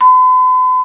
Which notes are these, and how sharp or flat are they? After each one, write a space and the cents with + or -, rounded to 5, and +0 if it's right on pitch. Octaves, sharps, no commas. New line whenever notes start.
B5 +45